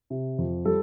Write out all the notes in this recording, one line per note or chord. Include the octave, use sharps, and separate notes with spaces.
C3
F2
G3 A4